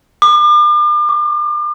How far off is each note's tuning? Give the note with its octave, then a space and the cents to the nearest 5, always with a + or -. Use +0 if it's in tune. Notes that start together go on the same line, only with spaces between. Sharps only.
D6 +40
D6 -25